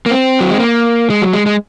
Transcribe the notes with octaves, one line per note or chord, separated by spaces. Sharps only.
A#3
C4
F#3
G#3
A#3
G#3
F#3
G#3
G#3